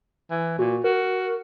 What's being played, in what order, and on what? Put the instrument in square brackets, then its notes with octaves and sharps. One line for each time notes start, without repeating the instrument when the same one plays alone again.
[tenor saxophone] E3
[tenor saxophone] A#2 [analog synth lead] F#4
[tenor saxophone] F#4 [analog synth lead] A#4